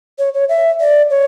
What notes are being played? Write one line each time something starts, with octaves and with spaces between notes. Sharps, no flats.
C#5
C#5
E5
D5
C#5